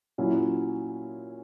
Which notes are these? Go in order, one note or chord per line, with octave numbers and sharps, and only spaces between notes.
A#2 F#3 C#4 E4